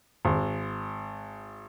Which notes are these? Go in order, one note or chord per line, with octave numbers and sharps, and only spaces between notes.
G#1